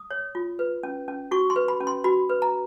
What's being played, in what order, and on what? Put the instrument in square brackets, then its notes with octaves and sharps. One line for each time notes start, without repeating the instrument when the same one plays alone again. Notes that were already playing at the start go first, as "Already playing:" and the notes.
Already playing: [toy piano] D#6
C#5
F4
B4
C#4
C#4
F#4 C#6
C6
B4
B5
C#4
C6
F#4 B5
B4
A#5